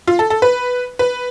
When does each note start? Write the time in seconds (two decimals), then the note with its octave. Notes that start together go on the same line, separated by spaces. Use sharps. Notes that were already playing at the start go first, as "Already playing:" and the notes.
0.07 F4
0.19 A4
0.30 A4
0.42 B4
0.99 B4